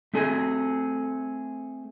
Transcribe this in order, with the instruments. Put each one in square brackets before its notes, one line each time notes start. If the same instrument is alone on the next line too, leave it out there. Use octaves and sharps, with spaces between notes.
[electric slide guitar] A3 C4 G#4 A4 C5 G#5